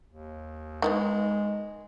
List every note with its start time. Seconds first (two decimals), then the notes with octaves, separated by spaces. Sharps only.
0.08 D#2
0.82 D#3 F#3 G#3 B3